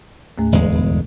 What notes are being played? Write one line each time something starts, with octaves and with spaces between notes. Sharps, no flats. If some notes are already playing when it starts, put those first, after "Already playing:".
D#2 A2 A3
G1 E2 G#3
B2